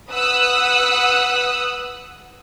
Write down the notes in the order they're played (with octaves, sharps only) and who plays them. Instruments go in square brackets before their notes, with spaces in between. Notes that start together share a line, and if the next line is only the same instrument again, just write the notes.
[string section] B4 F#5 D#6 E6 F#6